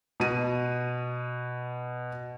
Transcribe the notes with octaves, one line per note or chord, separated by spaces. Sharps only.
B2 D#7